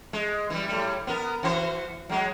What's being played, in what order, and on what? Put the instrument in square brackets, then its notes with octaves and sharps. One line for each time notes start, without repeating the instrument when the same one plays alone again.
[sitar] G#3
E3 G3
A2 G3
B3 A#4
E3 F#4 C5
F#3 G#3